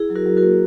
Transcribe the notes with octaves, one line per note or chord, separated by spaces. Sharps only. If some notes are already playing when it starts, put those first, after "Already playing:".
Already playing: E4 G#4
F#3
F#4 A#4
F#3
F#4 A#4
A#3